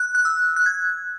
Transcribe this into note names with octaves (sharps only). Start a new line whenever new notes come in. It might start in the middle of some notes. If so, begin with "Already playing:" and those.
Already playing: F#6
F#6
E6
F#6
G#6